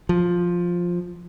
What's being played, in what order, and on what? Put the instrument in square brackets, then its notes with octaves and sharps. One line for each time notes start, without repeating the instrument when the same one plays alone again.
[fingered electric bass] F3